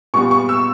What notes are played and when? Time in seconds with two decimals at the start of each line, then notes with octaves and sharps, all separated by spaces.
0.14 A#2 G3 B3 C#6
0.31 C#6
0.49 E6